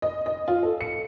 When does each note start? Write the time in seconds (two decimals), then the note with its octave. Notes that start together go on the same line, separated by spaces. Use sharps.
0.02 D#5
0.26 D#5
0.48 F4
0.63 A4
0.81 C#7